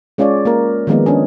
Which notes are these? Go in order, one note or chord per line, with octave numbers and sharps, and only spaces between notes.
G#3 C#4 F4 C#5 D5
A#3 F4 A#4
D#3 F3 G#3 A#3 B3 D#4
C#4 D4 G#4